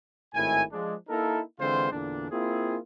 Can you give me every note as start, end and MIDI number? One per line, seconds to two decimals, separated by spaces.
0.34 0.63 32
0.34 0.63 45
0.34 0.63 51
0.34 0.63 64
0.34 0.63 80
0.71 0.95 53
0.71 0.95 56
0.71 0.95 62
1.09 1.40 58
1.09 1.40 63
1.09 1.40 64
1.09 1.40 69
1.09 1.40 70
1.60 1.91 50
1.60 1.91 52
1.60 1.91 56
1.60 1.91 60
1.60 1.91 65
1.60 1.91 72
1.91 2.30 40
1.91 2.30 46
1.91 2.30 50
1.91 2.30 62
2.31 2.77 58
2.31 2.77 60
2.31 2.77 64
2.31 2.77 65
2.31 2.77 68